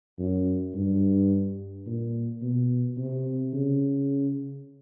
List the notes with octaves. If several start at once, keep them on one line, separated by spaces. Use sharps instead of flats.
F#2
G2
A#2
B2
C3
C#3